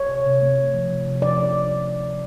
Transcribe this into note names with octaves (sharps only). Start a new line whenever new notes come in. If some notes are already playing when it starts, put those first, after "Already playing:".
Already playing: C#5
C3
C3
A3
C3
F3
C3
C3
F3 D5